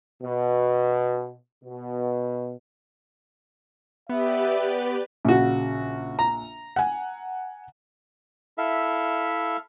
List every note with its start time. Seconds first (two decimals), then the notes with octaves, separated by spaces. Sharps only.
0.22 B2
1.64 B2
4.09 B3 G4 B4 D5 E5
5.25 A#1 C#3 F#4
6.19 A#5
6.76 F#5 G#5
8.58 E4 A4 E5 F5